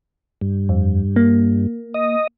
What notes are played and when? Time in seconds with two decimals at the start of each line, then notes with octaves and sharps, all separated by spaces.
0.41 G2
0.69 F2
1.16 A#3
1.94 D#5